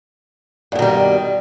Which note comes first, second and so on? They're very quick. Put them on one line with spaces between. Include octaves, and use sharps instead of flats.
G2 B2 D#3 G3